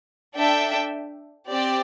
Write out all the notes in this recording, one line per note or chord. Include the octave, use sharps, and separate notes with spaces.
D4 A4 E5 G5
C4 G4 D5 G5